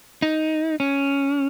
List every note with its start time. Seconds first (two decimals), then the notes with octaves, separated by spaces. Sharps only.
0.22 D#4
0.80 C#4